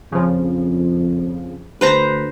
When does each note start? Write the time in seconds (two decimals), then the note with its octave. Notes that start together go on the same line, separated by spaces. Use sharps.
0.12 F2 C#3 F3
1.81 D2 B4 C5 A#5